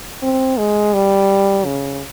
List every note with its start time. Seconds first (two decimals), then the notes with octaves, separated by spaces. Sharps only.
0.23 C4
0.58 G#3
0.94 G3
1.65 C#3